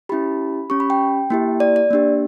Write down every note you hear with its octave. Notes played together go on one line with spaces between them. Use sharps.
C#4 E4 G4 B5
C#4 G4 C#6
B5
G5
A#3 E4 G4
D5
D5
A#3 D4 G4